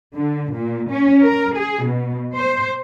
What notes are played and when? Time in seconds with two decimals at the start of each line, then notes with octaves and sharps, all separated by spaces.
0.16 D3
0.54 A#2
0.90 C#4
1.24 A#4
1.56 G#4
1.85 B2
2.36 C5